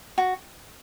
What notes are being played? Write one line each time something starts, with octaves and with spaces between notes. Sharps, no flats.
F#4